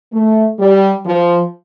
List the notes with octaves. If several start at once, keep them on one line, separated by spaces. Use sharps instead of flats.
A3
G3
F3